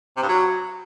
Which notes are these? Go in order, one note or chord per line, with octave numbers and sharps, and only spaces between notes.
C3
G2
F#3